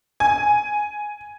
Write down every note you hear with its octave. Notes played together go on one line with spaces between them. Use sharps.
G#5